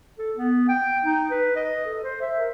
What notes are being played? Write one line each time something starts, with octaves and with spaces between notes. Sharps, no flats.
A4
B3
G5
D#4
B4
D#5
A4
C5
E5
A#4